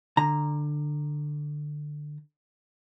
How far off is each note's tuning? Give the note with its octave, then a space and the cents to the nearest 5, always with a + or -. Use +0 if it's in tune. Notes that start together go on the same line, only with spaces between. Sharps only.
D3 +15 A#5 +0